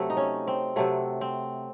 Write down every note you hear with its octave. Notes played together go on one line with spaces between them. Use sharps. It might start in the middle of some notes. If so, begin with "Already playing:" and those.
Already playing: C3 F#3 A3
D#4
C#4
C4
C3 F#3 A3
C4